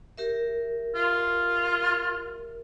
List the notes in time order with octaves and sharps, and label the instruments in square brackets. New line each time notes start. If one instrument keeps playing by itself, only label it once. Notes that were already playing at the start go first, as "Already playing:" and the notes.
[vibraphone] G4 A#4 E5
[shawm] F4